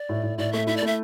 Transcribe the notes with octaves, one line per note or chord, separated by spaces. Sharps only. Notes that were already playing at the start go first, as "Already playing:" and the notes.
Already playing: D5
A2
A2
A2 D5
A3 E5
E4 E5
D5
A3 E5